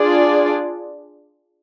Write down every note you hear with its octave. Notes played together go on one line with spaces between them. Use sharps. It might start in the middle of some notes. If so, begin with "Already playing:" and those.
Already playing: D4 F4 G#4 D5